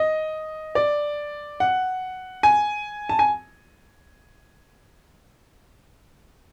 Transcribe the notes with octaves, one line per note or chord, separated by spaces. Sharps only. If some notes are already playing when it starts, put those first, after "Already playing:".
Already playing: D#5
D5
F#5
G#5
A5
G#5